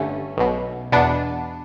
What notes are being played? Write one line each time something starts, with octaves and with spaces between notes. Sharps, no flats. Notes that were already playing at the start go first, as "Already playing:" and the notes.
Already playing: G1 G2 D3 A3 C#4
B1 B2
E2 B2 B3 D4